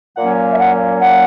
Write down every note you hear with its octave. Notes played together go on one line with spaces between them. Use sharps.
A#2 F#3 A#3 C#4 F#5
E5
F#5
F#5